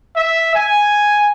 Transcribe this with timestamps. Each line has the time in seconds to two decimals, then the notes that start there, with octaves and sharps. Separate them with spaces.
0.16 E5
0.55 G#5